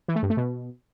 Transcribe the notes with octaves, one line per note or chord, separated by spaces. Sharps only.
E3
A3
G2
A3
B2